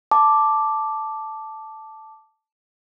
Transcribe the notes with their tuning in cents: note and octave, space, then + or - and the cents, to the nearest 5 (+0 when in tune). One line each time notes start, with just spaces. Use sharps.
A5 +0 D6 +0